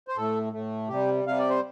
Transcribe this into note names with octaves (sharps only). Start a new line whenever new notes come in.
C5
A2 A3 A4
A2 A3
C3 G3 G4
C3 G3 F5
D5
C5